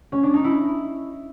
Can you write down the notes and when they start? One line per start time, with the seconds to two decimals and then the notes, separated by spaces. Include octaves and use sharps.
0.12 C#4
0.23 D4
0.34 D#4
0.44 E4